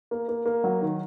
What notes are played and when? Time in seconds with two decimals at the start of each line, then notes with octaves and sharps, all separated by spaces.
0.11 A#3
0.28 A#3
0.46 A#3
0.64 F#3
0.81 D#3